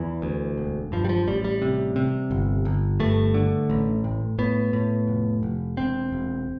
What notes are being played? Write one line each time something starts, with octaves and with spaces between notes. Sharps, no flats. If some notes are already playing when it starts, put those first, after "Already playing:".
Already playing: E2 E3
D2
E1
G2 F3
G3
F3
A1 G3
G3
C3
C3
G1
G1
G2 A3
D3
A1
A2
A2 B3
A2
F1
F1
E1 C4
E1